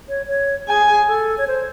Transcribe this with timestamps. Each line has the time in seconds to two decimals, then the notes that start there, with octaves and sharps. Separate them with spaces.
0.09 C#5
0.28 C#5
0.68 G#4 G#5
0.88 G#4
1.07 A4
1.38 C#5
1.47 C5